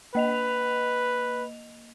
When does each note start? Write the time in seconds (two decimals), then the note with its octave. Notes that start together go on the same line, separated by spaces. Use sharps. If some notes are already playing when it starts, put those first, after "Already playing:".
0.15 A#3 B4 D#5 F7